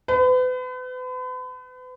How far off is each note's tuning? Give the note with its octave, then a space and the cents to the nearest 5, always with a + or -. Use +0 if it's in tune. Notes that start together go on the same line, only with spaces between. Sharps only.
B4 +40